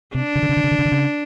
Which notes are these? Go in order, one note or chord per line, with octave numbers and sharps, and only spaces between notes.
C3 D4
C#3
D3
C#3
D3
C#3
D3
C#3
D3
C#3